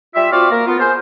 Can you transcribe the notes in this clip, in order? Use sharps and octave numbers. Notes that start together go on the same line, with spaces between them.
G3 F4 E5
C4 F4 F#4 D5 F5
A#3 A#4
B3 F4
G#4 A#4 C5